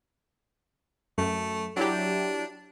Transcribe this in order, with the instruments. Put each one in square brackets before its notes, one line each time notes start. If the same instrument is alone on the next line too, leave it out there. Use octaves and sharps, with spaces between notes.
[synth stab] F#2 [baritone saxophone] A3
[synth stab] F#3 E4 G4 [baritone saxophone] D4